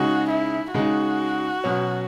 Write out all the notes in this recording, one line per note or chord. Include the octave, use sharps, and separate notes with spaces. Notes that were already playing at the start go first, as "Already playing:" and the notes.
Already playing: C#3 G#3 D#4 F#4
E4
C#3 G#3 D#4 F#4
B2 F#3 C#4